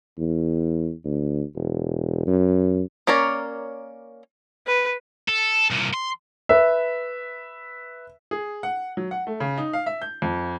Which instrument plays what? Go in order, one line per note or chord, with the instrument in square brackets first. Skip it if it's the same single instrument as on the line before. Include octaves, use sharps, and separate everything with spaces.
[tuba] E2
D2
E1
F#2
[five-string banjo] A#3 C#4 A#4 C#5 D5
[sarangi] B4
[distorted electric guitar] A4
C2 A#2
C6
[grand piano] B4 E5
[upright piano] G#4
F#5
F#3
F#5
A3
C#3
D#4
F5
E5
G6
F2